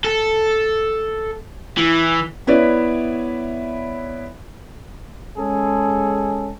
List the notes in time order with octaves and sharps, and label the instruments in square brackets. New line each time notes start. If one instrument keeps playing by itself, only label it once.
[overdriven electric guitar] A4
E3
[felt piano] B3 E4 B4 C#5 D5 E5
[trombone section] G#3 C#4 G#4 A4